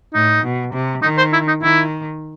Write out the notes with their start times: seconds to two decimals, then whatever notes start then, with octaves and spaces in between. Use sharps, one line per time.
0.14 A2 D#4
0.43 B2
0.74 C3
1.02 D#3 D#4
1.18 C5
1.33 E4
1.47 D#4
1.62 D#3 E4